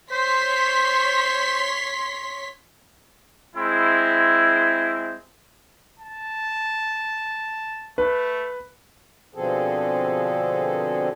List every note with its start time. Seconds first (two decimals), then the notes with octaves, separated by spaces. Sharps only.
0.12 C5 C#5 C6 B6
3.56 G#3 C4 E4
5.99 A5
7.98 A3 B4
9.35 B2 D3 F3 C4 G#4 A4